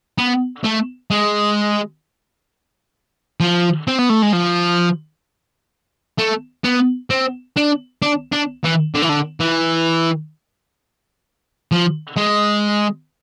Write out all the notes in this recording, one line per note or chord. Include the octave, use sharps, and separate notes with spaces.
B3
A3
G#3
F3
C4
B3
A3
G#3
F3
A3
B3
C4
D4
D4
D4
E3
D3
E3
D3
E3
F3
G#3